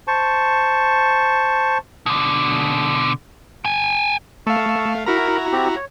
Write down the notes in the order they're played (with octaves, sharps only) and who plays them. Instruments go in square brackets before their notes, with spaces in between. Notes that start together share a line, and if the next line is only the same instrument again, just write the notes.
[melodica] C5 A5 C#6
[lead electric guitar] B2 D3
G5 G#5
[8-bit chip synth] A3 F5 [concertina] A5 C#6 E6
[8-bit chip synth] E4 F#4 A#5 [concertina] A#4 B5
[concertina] C4 G4
C#5